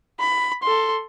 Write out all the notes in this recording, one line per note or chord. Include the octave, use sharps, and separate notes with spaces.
B5
A4 C6